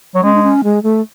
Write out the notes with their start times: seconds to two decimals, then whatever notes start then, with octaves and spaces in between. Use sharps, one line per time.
0.15 F#3
0.23 G#3 C#4
0.35 D4
0.43 C#4
0.64 G#3
0.83 A3